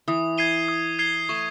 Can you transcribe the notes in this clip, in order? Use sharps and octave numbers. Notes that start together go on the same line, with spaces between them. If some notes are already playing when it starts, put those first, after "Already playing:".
E3 D#6
G#6 C7 D#7 G7
D#6
G#6 C7 D#7 G7
A3 C#6